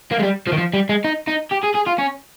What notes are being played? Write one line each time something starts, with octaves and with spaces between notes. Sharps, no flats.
A#3
G#3
G3
F3
D#3
F3
G3
G#3
D#4
D#4
G4
G#4
G#4
F4
C#4